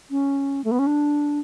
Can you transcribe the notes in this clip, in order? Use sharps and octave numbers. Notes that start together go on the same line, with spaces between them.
C#4
A3
B3
C#4
D4